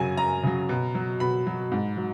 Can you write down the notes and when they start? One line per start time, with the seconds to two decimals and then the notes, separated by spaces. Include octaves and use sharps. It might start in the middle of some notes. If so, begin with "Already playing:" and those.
Already playing: F#2 C#3 F#3 G#5
0.17 F#2 A#5
0.43 C#3 F#3
0.69 B2
0.95 F#3
1.20 B2 B5
1.47 F#3
1.72 G#2
1.97 F#3